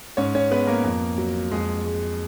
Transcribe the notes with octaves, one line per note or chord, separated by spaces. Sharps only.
G#2 C#4 C#5
C#4 C#5
G#3 B3 B4
A#3 A#4
F2
F#3
F2 G#3 G#4
G#3